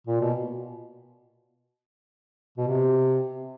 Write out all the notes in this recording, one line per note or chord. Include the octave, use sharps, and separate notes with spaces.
A#2
B2
B2
C3